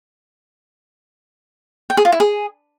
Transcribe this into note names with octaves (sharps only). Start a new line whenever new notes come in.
G5
G#4
F4
E4
G#4